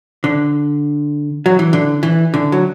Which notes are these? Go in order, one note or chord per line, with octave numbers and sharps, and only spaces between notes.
D3
F#3
E3
D3
E3
D3
F#3